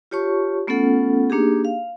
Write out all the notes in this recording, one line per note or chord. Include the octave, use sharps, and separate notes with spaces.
F4 G4 C#5 A5 C#6
A3 B3 C#4 F4 A4 F#5
A#3 D4 D#4 G4 G#4
F5